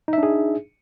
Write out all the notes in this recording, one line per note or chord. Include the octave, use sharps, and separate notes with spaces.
D4 D#4 G#4 E5